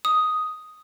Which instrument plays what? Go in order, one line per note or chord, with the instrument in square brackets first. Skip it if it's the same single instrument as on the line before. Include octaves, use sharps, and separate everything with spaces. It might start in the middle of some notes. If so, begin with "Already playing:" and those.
[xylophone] D#6